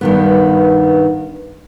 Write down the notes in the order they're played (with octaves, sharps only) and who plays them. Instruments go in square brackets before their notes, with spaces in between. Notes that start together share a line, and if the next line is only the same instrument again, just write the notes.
[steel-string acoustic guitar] G2 D#3 B3